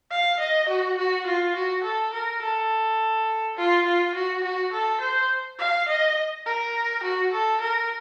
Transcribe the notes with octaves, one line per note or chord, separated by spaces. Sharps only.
F5
D#5
F#4
F#4
F4
F#4
A4
A#4
A4
F4
F4
F#4
F#4
A4
C5
F5
D#5
A#4
F#4
A4
A#4